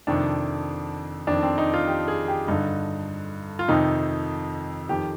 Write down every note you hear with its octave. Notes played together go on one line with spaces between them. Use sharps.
F2 C3 D#3 D4
F2 D#3 D4
C4
D#4
F4
G4
G#4
G4
G2 D3 D#4
F4
F2 C3 D#3 D#4
F2 D#3 G4